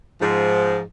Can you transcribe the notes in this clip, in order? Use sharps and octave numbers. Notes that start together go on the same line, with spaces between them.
G#2 F3